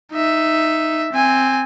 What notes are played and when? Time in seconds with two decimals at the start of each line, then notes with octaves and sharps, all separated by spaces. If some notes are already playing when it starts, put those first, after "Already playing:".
0.13 D#4 E5
1.13 C4 G#5